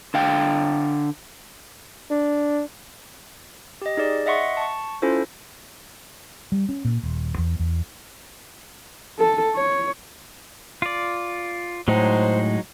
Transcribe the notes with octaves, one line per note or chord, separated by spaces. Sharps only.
D3 F5 G5
D4
G4 D#5
D#4 G#4 D5
D#5 E5 F#5 C6 C#6
A5 C#6
C#4 E4 F4 A4 C5
G3
C#4
A#2
D#1
E2
E2
A4
C#5
F4 D5
A2 F#3 G#3 D#4 C5